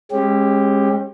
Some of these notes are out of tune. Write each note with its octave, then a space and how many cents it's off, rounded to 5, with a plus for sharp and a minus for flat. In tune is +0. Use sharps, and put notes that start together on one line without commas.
G#3 -15 C#4 -35 G4 +0